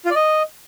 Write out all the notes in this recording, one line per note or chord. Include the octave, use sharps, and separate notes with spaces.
F4
D5
D#5